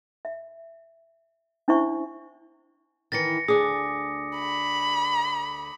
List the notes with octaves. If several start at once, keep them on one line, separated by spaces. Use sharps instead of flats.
E5
C#4 D4 E4 C5 E5 C#6
D#3 E3 A6 A#6 C#7
D2 D4 G#4 D6 D#6
B5